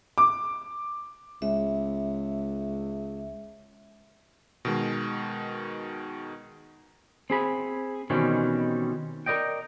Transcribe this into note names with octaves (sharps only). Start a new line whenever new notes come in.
D6
C#2 E5
B2 D#3 G#3
C4 G#4 B5
B2 D#3 E3 G3 C4 C#4
A#4 B4 D5 D#5 G5